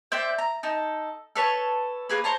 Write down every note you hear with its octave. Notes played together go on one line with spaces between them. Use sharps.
C5 D5 E5 G5
A#5
D#4 A4
A4 B4 C#5 A5
A#3 G#4 B4
C5 C#5 A5 A#5